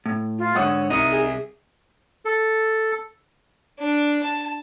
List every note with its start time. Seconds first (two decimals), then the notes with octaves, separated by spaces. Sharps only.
0.06 A2
0.38 F4
0.55 G#2 D3 C#5 F#5 D#6 E6
0.90 C2 D#4 D#6 C#7
1.11 G#4
2.25 A4
3.80 D4
4.23 A5